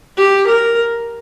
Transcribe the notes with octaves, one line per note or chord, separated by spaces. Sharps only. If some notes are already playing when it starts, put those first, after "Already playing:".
G4
A#4